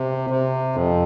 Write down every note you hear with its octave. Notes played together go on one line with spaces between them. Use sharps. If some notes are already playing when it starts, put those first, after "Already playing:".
Already playing: C3
C3
F2